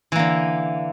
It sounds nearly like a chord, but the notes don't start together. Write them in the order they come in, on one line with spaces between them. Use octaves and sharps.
E3 A#3 D3